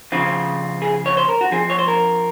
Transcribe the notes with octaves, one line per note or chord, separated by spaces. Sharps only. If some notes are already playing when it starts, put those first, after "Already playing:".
C#3 F3 C4 F4
G#4
C#5
C5
A#4
F#4
F3 C4 G#4
C#5
C5
A#4